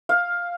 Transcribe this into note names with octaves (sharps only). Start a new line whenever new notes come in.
F5